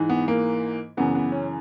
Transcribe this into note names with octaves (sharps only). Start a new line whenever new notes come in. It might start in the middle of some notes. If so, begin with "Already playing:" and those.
Already playing: G#2 E3
B3
A#3
F#2 C#3 E3 B3
B3
C#4